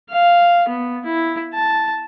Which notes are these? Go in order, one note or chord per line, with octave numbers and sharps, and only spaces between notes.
F5
B3
E4
A5